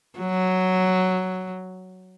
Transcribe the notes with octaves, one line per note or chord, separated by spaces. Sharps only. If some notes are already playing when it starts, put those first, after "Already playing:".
F#3